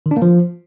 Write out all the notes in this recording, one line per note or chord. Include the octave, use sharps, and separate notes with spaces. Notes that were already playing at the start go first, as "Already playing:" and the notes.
D#3
D4
A#3
F3